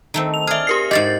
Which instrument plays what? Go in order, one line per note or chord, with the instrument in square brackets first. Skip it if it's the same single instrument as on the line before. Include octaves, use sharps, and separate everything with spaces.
[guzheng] D#3 A3 C4
[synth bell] F7
[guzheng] G#4 D5 [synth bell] E5 F6
[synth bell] G4 A#4 C7
[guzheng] G#2 F#4 G4 [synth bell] D#5 A6